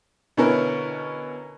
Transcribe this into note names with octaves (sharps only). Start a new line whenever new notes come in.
B2 D3 C#4 E4 A#4 B4